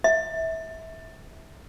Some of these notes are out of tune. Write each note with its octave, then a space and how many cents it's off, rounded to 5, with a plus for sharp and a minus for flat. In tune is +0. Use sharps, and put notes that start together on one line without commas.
E5 -25